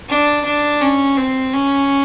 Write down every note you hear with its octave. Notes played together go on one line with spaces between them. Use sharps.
D4
D4
C#4
C4
C#4